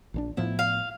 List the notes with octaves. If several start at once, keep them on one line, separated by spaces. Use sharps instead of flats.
A#1 D3 D4
A2 F3 B3 E4
F5